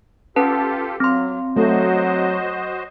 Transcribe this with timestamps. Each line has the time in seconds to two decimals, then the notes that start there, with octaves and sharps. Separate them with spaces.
0.36 C#4 F4 G4 A4 B4 A5
1.00 F#3 C4 C6
1.57 F#3 A3 F#4 C5 D#5